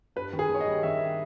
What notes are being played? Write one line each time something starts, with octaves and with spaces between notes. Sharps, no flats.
G2 B4
D#3
G#4
D#3
C#5
D#5
G3
D#3 E5